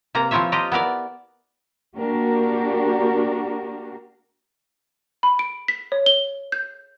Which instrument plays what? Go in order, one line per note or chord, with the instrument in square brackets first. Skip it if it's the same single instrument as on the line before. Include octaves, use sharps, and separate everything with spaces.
[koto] C3 A#3 A#5
F3 C4 E4 F4 C#5 E5
F3 F4 G4 D#5 G5 A#5
B3 E4 A#4 D5
[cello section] A#3 D4 F#4 G4 A#4
[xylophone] B5
D7
B6
C#5
G7
G6